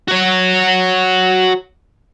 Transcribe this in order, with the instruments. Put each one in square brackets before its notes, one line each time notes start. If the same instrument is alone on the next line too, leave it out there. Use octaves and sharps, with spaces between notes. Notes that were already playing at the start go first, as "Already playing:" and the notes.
[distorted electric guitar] F#4 C#5